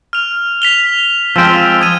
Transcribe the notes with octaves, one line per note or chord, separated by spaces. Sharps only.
F6 F7
B6 F7 G7
F3 G#3 C4 E6 F6
D#6 G#6 D#7